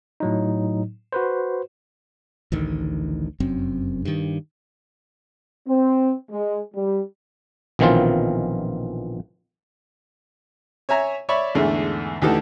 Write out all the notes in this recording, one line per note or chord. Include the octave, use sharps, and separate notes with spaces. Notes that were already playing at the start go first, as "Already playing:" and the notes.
A2 F#3 D#4
F#4 B4 C5
A1 D2 D#3
F1 F#2 C4
G2 D#3
C4
G#3
G3
A#1 B2 D#3 E3 C4 F4
C#5 E5 G#5 A#5
C#5 D5 E5 B5 C#6
E2 G#2 D3 A3
D2 E3 D#4 G4 A4 F#5